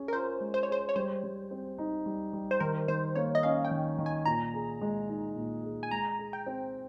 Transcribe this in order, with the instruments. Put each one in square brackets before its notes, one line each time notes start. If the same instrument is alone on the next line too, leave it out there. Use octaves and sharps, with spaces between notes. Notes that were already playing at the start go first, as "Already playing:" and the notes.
Already playing: [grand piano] C#4 G#4
[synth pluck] A#4
[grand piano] F4 [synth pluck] C5
[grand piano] G#3
[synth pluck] C5
C#5
[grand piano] G#4 [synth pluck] C5
[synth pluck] C#5
[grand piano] G3 [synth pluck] C5
[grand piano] G3
C4
D#4
G3
G3
[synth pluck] C5
[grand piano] D#3 [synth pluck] A#4
[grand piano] D#3 [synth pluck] C5
[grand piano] A#3 [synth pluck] C#5
[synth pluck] D#5
[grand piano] C#4 [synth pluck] F5
[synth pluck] G5
[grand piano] D#3
D#3
[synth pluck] G#5
[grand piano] A#2 [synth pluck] A#5
[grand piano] G#4
G#3
D#4
A#2
G#4
[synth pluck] G#5
[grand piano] G#3 [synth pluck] A#5
[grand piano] G#4
[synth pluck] G5
[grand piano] C4